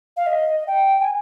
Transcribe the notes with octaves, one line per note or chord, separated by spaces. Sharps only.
F5
D#5
G5
G#5